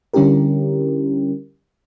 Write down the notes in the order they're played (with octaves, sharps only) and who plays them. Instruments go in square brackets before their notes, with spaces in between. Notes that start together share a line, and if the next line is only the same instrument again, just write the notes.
[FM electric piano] D3 G3 C#4 E4 G4 A#4